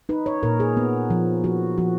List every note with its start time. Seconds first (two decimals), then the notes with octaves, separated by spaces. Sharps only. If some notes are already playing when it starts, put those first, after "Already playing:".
0.09 D#4 B4
0.26 C#5
0.43 A#2 A#4
0.60 G#4
0.77 B3
1.10 F3
1.44 F3 F#4
1.78 F3 F#4